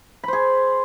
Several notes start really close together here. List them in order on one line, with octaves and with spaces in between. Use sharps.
B5 C5 G#4